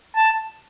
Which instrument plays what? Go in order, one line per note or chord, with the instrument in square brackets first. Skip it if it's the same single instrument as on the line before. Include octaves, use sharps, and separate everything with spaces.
[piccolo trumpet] A5